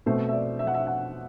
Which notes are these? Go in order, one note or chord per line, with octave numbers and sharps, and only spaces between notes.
B2 A3 C4 C5
E5
D5
E5
F#5
E5
F#5